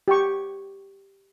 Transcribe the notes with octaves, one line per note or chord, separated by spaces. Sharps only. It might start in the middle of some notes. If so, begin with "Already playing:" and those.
G4 G5 C#6